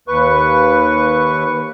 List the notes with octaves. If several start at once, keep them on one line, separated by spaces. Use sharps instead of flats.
D#2 B4 C#6